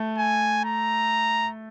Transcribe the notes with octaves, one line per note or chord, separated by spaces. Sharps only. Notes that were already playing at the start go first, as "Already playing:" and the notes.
Already playing: A3
G#5
A#5